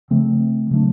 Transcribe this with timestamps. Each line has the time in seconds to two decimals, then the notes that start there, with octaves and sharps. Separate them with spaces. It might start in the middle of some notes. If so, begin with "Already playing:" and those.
0.10 C#3 F3 A3 C4
0.71 C#3 F#3 A3 D4